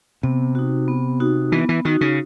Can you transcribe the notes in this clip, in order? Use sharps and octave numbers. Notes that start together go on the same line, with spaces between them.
C3 B3
D#4 F#4
B3
D#4 F#4
E3 B3
E3
D#3 D#4 F#4
C#3